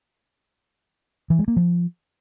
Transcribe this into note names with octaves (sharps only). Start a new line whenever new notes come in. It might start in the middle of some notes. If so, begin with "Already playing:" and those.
E3
G#3
A#3
F3